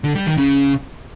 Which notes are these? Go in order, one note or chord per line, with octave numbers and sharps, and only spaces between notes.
D3
G3
D#3
C#3